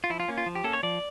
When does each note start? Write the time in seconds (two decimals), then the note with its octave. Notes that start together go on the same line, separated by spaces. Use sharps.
0.04 F4
0.10 F3 E4
0.20 F4
0.28 A#3 C#4
0.38 F4
0.46 F3
0.55 G4
0.64 A#3 C#4 A4
0.73 C#5
0.83 F3 D5